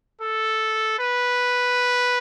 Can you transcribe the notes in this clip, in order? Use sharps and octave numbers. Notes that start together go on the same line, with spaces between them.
A4
B4